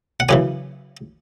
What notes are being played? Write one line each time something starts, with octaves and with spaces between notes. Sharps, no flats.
F#5
F#2 C#3 E3 G#5